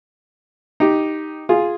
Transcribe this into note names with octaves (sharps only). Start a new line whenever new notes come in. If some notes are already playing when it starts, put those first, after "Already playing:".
D#4 G4
F4 G#4